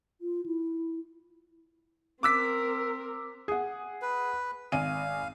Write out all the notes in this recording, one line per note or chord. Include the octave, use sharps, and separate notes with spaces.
F4
E4
C4 A#4 D6 E6 B6
G#4 F#5
B4
G#1 F5 G#5 D#7